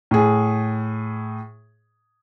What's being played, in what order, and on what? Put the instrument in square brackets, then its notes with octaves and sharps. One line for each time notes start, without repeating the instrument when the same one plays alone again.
[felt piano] A2 G#4